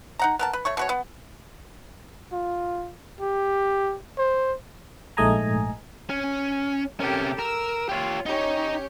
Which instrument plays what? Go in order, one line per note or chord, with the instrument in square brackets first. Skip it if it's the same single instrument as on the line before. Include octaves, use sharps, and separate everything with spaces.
[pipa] D#4 F#5 A#5
B3 A#4 A5
B4
A3 C#5 C#6
B2 F#4 C#5
B3
[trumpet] F4
G4
C5
[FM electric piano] A#1 G#2 A3 D#5 G#5 A#5
[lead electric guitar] C#4
[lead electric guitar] C3 C#4 [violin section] G4 A4 A#4
[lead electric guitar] A#4 [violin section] E6
[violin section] F4 [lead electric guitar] G4 C#5
[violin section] C#4 G4 C#5 [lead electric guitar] D#4